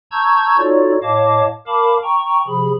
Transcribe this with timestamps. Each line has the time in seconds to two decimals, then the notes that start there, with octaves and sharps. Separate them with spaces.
0.11 A5 A#5 C#6 E6 G6 G#6
0.58 D#4 F4 F#4 A4 C#5 D5
1.03 A2 C#5 D#5 F5 A5 D6
1.67 A#4 F5 A5 B5 D6
2.03 G5 A#5 C#6
2.47 C3 F3 G#4 B5